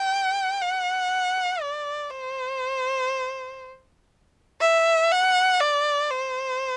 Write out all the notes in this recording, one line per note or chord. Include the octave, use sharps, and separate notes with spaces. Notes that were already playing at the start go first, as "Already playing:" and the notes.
Already playing: G5
F#5
D5
C5
E5
F#5
D5
C5